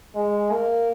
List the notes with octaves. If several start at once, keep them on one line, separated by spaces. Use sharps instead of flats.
G#3
A#3